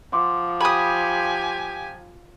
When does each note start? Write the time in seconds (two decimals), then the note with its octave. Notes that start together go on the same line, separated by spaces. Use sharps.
0.12 F3 F#5 C6 D6
0.61 G4 G#5 B5 D#6